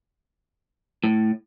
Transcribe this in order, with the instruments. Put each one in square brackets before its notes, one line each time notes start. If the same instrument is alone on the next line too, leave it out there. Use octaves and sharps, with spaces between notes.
[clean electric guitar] A2